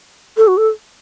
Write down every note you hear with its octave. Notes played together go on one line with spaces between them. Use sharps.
A4
F#4
A4